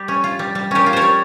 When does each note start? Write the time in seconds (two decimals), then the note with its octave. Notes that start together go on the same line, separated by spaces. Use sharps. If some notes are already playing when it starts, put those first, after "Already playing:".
Already playing: G3 G4
0.08 C#4
0.24 F4
0.39 G3
0.55 G3
0.71 C#4 G4 A#4
0.86 F4
0.93 A#4 C5 C#5
1.02 G3